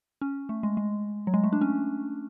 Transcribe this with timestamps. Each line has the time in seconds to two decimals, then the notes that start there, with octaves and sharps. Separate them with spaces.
0.21 C#4
0.49 A3
0.63 G#3
0.77 G#3
1.27 F#3
1.34 G#3
1.44 A3
1.53 D4
1.61 C#4